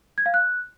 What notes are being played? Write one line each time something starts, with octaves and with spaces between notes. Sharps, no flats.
G#6
F5
F#6